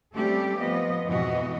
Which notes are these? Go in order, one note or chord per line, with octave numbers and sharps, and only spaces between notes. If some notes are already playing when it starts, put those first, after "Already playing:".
G3 A3 C4 C#4 G4 A4
F3 B3 D#5
F2 G#2 B2 E3 F#4 D#5